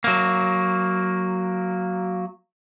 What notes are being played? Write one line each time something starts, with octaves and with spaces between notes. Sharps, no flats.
F#3 A#3